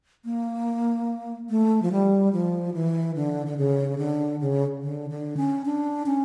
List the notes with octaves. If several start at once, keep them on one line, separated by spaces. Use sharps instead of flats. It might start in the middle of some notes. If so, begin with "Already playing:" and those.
A#3
A3
F3
G3
F3
E3
D3
D3
C#3
D3
C#3
D3
D3
C#4
D4
C#4